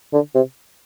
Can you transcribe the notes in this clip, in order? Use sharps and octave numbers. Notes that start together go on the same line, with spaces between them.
D3
C3